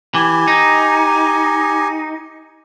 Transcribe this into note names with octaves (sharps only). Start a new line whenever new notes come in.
E3 G4 G#5
D#4